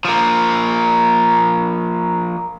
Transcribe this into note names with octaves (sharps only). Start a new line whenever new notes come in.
F3 A#3